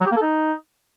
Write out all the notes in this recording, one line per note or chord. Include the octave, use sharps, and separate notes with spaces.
F#3
G4
A#3
A4
D#4